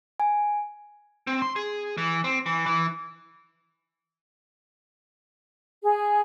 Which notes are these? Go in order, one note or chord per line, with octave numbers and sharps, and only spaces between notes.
G#5
C4
C6
G#4
E3
C4
E3
E3
G#4